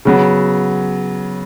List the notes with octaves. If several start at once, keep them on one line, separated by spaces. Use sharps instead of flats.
C#3 F#3 B3